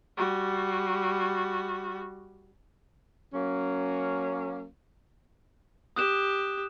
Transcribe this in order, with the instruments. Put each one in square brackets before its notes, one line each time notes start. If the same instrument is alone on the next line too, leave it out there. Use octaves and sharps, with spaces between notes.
[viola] G3 F#4
[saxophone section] F#3 A#3 C#4
[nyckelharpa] G4 [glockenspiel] D#6 F#6 E7